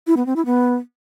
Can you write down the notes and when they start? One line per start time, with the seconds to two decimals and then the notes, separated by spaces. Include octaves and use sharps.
0.07 E4
0.17 B3
0.26 C4
0.36 E4
0.46 B3